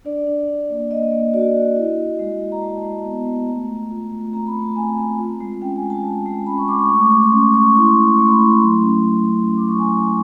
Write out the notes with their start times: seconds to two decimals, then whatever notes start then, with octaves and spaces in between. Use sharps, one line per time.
0.05 D4 D5
0.27 D4
0.48 D4
0.70 A#3
0.90 A#3 D#5
1.12 A#3
1.33 F#4 D5
1.55 F#4
1.76 E4 D#5
1.98 E4
2.19 G#3
2.40 E4
2.52 A#5
2.61 G#3 A5
2.83 G#3
3.04 B3
3.26 G#3
3.47 A3 A#5
3.69 F4
3.91 F4
4.11 A3
4.33 C4 A#5
4.47 B5
4.55 A3
4.62 A5
4.76 C4 G#5
4.97 C4
5.19 F4
5.41 G#3
5.61 C#4 G5
5.76 G#5
5.83 G#3
5.90 A5
6.04 G#3
6.26 G#3
6.46 C#4 B5
6.58 C#6
6.68 G#3 D6
6.79 C#6
6.89 A3 C#6
7.00 D6
7.11 A3 C#6
7.22 C6
7.32 C#4 C#6
7.54 A3 C#6
7.75 E4 C6
7.86 C6
7.97 A3
8.08 C#6
8.17 A3 C6
8.28 B5
8.39 E4 C6
8.50 C6
8.60 F#3 C6
8.82 C#4
9.03 C#4
9.25 C#4
9.46 C#4 C6
9.57 D6
9.68 F#3 C#6
9.79 G#5
9.89 F#3